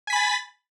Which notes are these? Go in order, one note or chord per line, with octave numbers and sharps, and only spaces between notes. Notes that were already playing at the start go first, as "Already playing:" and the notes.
G#5 B5 A6 B6